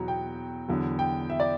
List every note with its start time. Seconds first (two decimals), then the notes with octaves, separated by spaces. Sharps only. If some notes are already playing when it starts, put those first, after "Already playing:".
Already playing: E2 B2 F#3 A#5
0.08 G5
0.68 E2 D3 F#3
0.99 G5
1.30 E5
1.40 D5